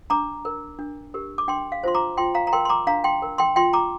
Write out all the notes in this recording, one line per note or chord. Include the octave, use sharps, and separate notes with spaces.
D4 A#5 D6
A#4
D4
G4 A#4
D6
D4 G5 C6
F5
F4 C5 C6
A#5 D6
F4 G5 C6
F5 A#5
A#5
A#4 G5 C6
C6
A#5 D6
D4 F5 A#5
G5 C6
A#4
G5 C6
F4 G5 C6
A#5 D6